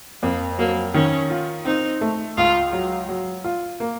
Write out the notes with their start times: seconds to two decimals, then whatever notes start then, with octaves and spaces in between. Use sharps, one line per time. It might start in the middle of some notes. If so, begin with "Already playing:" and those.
0.23 F2 A#3
0.58 F#3 A#3
0.94 D#3 C#4
1.30 F4
1.65 C4 D#4
2.01 A3
2.37 C#2 F4
2.73 F#3
3.09 F#3
3.44 F4
3.80 A#3